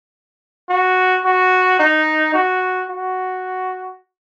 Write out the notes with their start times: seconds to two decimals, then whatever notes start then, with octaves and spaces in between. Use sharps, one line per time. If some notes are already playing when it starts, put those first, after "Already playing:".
0.70 F#4
1.25 F#4
1.80 D#4
2.34 F#4
2.90 F#4